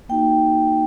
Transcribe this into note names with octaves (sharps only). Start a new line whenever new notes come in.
A#3 D#4 F#4 G5